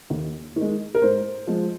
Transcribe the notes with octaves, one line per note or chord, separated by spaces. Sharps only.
D#2
D#3
G#3
A#4
G#2 C5
F3 G#3